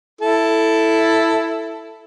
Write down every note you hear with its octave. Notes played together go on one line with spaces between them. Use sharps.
E4 A4